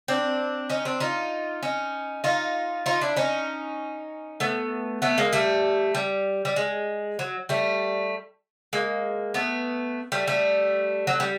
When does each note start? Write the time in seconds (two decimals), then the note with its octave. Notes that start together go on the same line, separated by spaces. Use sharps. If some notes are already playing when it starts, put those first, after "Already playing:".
0.08 C4 D4
0.70 C#4 D#4
0.85 C4 D4
1.00 D#4 F4
1.63 C#4 D#4
2.24 D#4 F4
2.86 D#4 F4
3.01 D4 E4
3.16 C#4 D#4
4.40 A3 B3
5.02 A3 B3
5.18 G#3 A#3
5.33 G3 A3
5.95 G3
6.45 G3
6.56 G#3
7.19 F#3
7.49 G3 A3
8.73 G#3 A#3
9.34 A3 B3
10.12 G3 A3
10.27 G3 A3
11.07 F#3
11.20 G3